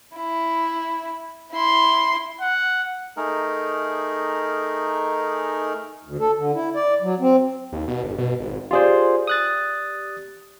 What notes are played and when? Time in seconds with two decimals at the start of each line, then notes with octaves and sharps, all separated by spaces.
0.16 E4
1.52 E4 C6
2.41 F#5
3.17 A3 D#4 G#4 A#4
6.04 D2
6.19 A4
6.37 D3
6.54 E4
6.75 D5
7.02 F#3
7.20 C4
7.73 D#2
7.88 B2
8.04 G1
8.18 B2
8.40 G#1
8.71 F4 G4 G#4 C5 D5
9.27 D#6 F#6 A6